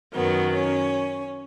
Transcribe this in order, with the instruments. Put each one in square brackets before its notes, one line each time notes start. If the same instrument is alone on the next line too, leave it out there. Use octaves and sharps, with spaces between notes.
[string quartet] F#2 D#3 F#3 B3
C#4